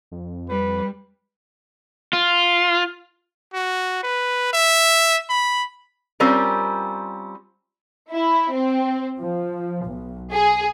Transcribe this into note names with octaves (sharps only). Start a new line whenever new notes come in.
F2
G3 B4
F4
F#4
B4
E5
B5
G3 C4 C#4 F4 A#4
E4
C4
F3
B1
G#4